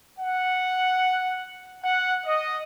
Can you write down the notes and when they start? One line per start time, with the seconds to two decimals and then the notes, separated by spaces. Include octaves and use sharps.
0.20 F#5
1.84 F#5
2.27 D#5